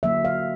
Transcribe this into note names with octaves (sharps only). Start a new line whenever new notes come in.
D3 F#3 A#3 E5
F5